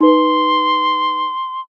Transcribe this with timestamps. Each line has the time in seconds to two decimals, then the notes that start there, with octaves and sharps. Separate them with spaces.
0.01 D#4 B4 C6